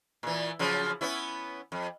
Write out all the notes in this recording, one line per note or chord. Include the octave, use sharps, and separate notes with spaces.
A#2 E3
C#3 F3 F#3
B3 C#4 E4
F2